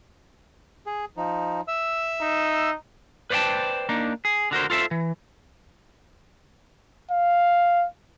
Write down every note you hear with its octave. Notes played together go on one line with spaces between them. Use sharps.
G#4
F3 D#4
E5 E6
D#4
B4 C5 D5 E5 G5 A5
A#3 D4 D#4
G#4
D3 F#4 A#4 C5
F4 A4 C5 E5
E3
F5